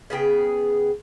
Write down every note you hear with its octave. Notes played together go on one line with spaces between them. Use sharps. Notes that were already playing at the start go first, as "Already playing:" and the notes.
C#3 B3 G#4 G5